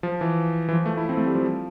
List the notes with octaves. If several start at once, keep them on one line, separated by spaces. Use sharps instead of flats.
F3
E3
E3
F3
A3
E4
C4
A3
G3
F3